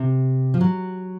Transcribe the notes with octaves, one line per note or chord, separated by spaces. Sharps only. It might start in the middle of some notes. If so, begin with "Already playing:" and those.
Already playing: C3
F3
F#3